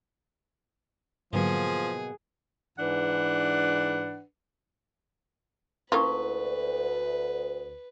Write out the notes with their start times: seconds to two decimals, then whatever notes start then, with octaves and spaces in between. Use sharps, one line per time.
1.33 G#2 B2 D3 F3 F#3 A#3 G#4
2.79 G#2 E3 D4 B4 F#5
5.92 D2 A#3 C#4 E4 F4 A#4 B4 C#6